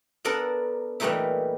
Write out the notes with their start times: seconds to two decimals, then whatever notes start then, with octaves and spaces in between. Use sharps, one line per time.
0.25 B3 D4 A4 A#4 D5
1.00 A#2 E3 G3 A3 D#4 E4